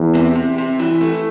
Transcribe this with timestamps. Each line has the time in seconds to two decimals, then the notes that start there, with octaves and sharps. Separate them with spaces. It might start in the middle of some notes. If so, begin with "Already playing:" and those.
Already playing: E2
0.15 C3
0.36 C3
0.58 C3
0.79 E3
1.01 A3